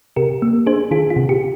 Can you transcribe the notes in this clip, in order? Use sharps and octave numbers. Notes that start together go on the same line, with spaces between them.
C3 G4 A#4
A#3
D4 G#4 C5
D#3 F4 G#4
F4
C3
G4